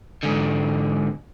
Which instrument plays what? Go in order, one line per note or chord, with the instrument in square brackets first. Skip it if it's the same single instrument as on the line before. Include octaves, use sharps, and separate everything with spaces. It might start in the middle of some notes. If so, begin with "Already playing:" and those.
[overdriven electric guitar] G#2 D3